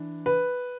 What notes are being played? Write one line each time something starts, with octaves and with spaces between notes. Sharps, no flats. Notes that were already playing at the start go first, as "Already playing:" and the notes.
Already playing: E3 D4
B4